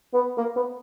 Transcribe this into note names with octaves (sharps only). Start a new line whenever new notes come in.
B3
A#3
B3